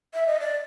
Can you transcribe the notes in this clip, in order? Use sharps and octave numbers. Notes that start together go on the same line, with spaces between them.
E5
D#5
D5